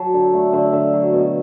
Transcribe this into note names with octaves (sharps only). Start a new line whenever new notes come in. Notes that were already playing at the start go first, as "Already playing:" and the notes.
Already playing: F#3 A5
D3
A3
D3
D3 E5
F#3
B2